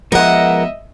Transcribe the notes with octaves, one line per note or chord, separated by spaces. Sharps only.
F3 G#3 B3 A#4 D#5 E5 F#5